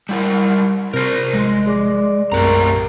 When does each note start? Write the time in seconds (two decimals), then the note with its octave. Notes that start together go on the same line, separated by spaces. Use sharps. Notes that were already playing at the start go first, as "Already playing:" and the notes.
0.09 G3 E4 A#4
0.94 C3 A#4 C5 A#6
1.33 A1 F3 G#3
1.66 G#4 D5 D6
2.32 B1 F#2 A2 C4 G4 A#4 A#5